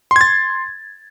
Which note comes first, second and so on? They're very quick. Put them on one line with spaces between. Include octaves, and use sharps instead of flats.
C6 G#6 A6